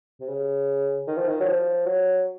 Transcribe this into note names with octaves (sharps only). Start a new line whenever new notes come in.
C3
C#3
D#3
F3
D#3
F#3
F3
F#3